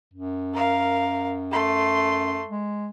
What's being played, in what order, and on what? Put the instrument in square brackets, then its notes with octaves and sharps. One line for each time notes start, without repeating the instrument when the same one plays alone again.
[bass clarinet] F#2
[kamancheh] A#4 F5
A3 C6
[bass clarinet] G#3